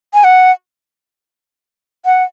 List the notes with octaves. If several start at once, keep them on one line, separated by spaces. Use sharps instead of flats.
G#5
F#5
F#5